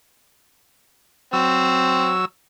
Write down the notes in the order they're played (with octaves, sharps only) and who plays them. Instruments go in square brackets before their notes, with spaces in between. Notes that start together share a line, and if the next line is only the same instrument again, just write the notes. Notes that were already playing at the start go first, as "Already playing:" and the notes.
[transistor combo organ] F#3 E6 [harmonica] C4